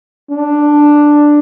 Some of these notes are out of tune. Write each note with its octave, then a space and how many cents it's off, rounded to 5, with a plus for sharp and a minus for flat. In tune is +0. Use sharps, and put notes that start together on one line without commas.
D4 +5